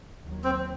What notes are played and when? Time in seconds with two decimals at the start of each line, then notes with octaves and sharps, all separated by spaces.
0.23 D#2 D#3 F#3
0.44 C4